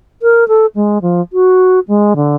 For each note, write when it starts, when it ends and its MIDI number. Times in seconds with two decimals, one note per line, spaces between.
0.22 0.47 70
0.48 0.66 69
0.75 0.98 56
1.02 1.21 53
1.33 1.79 66
1.88 2.14 56
2.16 2.36 50